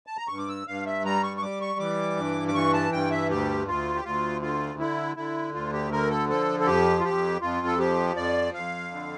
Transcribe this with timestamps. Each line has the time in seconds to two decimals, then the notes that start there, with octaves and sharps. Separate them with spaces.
0.07 A5
0.17 A#5
0.28 G2 C#6
0.38 D6
0.48 E6
0.67 G2 F5
0.86 E5
1.05 G3 A#5
1.23 C#6
1.37 C#6
1.42 G3 D6
1.61 C#6
1.80 E3 D6
2.17 G2
2.48 D6
2.54 E3 C#6
2.74 A5
2.92 G2 G5
3.11 E5
3.29 D2 G4
3.67 D2 F4
3.96 G4
4.04 D2 F4
4.42 D3 F4
4.79 D3 E4
5.16 D3 E4
5.54 D2 F4
5.73 G4
5.91 D3 A#4
6.10 A4
6.29 F3 A4
6.60 A4
6.66 F2 G4
6.99 F4
7.04 F2 G4
7.41 F2 F4
7.67 A4
7.79 F3 G4
8.16 F2 D5
8.54 F2 F5
8.91 D3